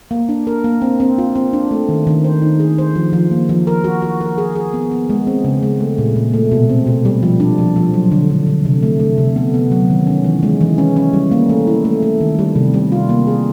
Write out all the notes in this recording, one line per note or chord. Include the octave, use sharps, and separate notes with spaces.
A#3
D4
A#4
A#3
C4
C4
F4
C4
D4
A3
D#3
D#3
C5
D#4
G#4
C5
F3
F3
A#3
F3
A#4
F#4
F#4
A#4
G#4
G#4
B3
B3
G#3
C4
C#3
G#3
A3
A#2
A#2
A3
B2
C4
B2
G3
F3
D4
F3
F3
F#3
D3
D3
D3
C3
A3
A3
C3
B3
B3
F#3
D#3
C#4
E3
G#3
E3
C#4
C#4
G3
A#3
A3
E4
A3
A3
D#3
G3
C3
G3
F4
A#3
G#4